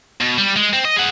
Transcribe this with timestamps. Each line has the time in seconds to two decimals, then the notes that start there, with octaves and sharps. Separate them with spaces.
0.21 B2
0.38 G3
0.56 G#3
0.73 C4
0.85 D#5
0.96 G#4 F#5